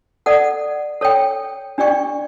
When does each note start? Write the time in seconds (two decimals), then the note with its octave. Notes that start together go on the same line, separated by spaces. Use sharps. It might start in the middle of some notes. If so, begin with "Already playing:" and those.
0.26 A4 D5 F#5
1.01 A4 C#5 G5
1.78 D4 G4 D5 G5 C#6